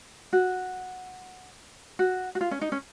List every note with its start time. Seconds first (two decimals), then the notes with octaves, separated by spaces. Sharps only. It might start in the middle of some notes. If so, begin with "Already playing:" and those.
0.33 F#4
1.99 F#4
2.35 F#4
2.41 F4
2.51 C#4
2.61 D#4
2.72 C#4